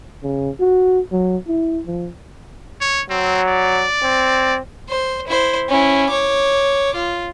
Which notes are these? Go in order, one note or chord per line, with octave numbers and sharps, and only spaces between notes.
C#3
F#4
F#3
E4
F3
C#5
F#3 C4
D5
C4
C5
E4 C5
C#4 E4
C#5 D6
F4